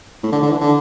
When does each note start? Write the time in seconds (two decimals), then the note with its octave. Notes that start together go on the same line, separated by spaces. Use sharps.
0.23 A2
0.32 D3
0.42 D3
0.51 E3
0.61 D3